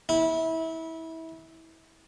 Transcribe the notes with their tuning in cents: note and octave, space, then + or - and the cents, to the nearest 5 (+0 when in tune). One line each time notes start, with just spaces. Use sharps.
E4 -25